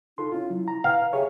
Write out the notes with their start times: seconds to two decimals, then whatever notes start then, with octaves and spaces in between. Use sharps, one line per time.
0.18 D#4 F4 A4 C6
0.32 C#4 E4 F4
0.50 F#3
0.68 A#5
0.84 B4 F5
1.13 G4 G#4 C#5 E5